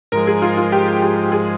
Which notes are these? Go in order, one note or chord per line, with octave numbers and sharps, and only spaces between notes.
G#2 F3 G#3 A#4
G#4
F4
F4
G4
G4
G#4